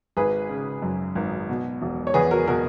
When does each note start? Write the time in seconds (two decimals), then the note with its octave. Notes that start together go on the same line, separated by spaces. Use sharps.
0.17 G#1 G#4 B4
0.49 C#3
0.82 F#2
1.15 G#1
1.49 B2
1.82 E1
2.07 C#5
2.14 E2 G#4 B4
2.31 F#4 A#4
2.47 B2 F#4 A#4